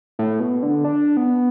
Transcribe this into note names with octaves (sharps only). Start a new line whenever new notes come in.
A2
B2
D3
D4
B3